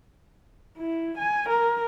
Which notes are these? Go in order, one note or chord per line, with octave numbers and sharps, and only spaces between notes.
E4
G#5
A#4